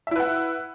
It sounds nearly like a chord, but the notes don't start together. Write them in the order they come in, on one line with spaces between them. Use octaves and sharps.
E5 E4 B4 F#5